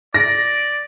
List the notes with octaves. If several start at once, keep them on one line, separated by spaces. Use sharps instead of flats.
D5 A#6